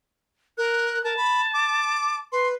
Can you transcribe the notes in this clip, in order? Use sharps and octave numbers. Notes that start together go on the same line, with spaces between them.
A#4 F#6
A#4 A5
B5
D6
B4 C6